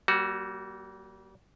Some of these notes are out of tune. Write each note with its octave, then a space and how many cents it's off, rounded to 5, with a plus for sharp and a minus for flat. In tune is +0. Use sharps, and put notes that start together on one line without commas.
G3 -30 A#3 +15 F#4 +0